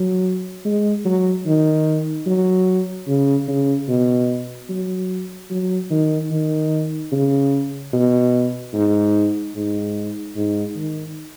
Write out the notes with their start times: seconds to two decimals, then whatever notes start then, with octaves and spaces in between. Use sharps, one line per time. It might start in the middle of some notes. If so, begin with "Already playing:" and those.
Already playing: F#3
0.65 G#3
1.05 F#3
1.46 D#3
2.27 F#3
3.08 C#3
3.48 C#3
3.89 B2
4.70 F#3
5.51 F#3
5.91 D#3
6.31 D#3
7.12 C#3
7.93 B2
8.74 G#2
9.55 G#2
10.36 G#2
10.76 D#3